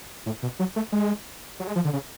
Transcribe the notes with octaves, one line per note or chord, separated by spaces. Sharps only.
A2
B2
F#3
A3
G#3
F#3
G#3
F3
D3
C#3